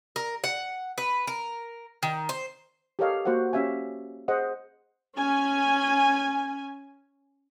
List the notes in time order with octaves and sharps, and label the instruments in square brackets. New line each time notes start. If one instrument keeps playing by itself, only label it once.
[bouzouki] A#4
F#5
B4
A#4
D#3
C5
[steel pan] G4 A4 A#4 C#5 D#5 F5
A#3 F#4 C5 F5 F#5
C#4 G4 E5 F5 G#5
G#4 C5 D#5 F#5
[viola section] C#4 G#5